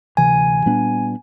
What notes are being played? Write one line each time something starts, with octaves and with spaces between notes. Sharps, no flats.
D2 C3 E3 G#5
A#2 G3 B3 D4